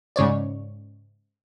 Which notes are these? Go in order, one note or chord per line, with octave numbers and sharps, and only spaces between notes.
G#2 C#3 C#5 D5